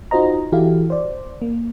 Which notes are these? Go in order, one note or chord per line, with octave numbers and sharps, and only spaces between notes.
D#4 F4 F#4 C5 D#5 A#5
E3 E4 F#4 G4 A4 F5
C5 D5
A#3